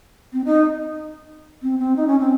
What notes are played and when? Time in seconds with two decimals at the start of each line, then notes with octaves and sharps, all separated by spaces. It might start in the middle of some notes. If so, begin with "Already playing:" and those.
0.32 C4
0.44 D#4
1.62 C4
1.78 C4
1.96 D#4
2.07 C#4
2.19 C4